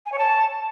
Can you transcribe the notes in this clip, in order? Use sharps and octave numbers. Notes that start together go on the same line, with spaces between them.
G#5
C#5
A5